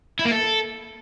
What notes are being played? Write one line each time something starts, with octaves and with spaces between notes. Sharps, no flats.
E4
A#3
A4